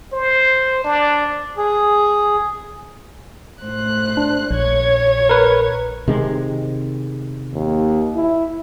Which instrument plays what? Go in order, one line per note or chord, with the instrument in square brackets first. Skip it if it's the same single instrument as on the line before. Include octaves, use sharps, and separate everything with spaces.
[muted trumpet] C5
D4
[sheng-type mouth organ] G#4
[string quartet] A2 C5 F#6
[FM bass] D4
[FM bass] A#1 [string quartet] C#5 G#6
[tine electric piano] A#4 B4
[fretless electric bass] C3 D#3 G#3
[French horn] D#2
E4